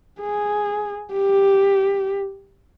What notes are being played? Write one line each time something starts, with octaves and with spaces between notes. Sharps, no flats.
G#4
G4